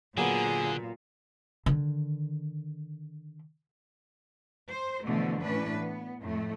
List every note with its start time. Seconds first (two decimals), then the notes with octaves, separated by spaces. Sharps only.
0.17 A#2 D3 F#3 A#3 B3 G#4
1.66 D3 D#3
4.68 C5
5.05 B2 D3 E3 F3 A3
5.43 A2 E3 C#4 D4 B4
5.79 B3
6.21 F2 A2 A3